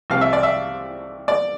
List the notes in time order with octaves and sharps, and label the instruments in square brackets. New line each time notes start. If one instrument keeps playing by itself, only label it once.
[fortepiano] C2 C3 F3 F5
E5
D5
E5
D5